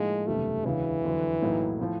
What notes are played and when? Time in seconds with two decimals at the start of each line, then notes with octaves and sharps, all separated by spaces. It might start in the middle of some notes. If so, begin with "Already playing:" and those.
Already playing: A2 F3 G#3 A#3 D#4
0.27 F#1 E2 C3 D#3 G3 A3
0.65 E1 D2 C#3 E3
1.04 F2 D3 F#3
1.42 B1 A2 F#3 A#3 D#4
1.81 A2 F3